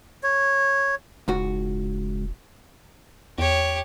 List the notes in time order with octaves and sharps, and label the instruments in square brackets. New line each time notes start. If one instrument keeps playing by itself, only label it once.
[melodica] C#5
[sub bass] E1 [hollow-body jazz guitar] C#2 G#2 F#4
[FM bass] E2 [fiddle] G4 C#5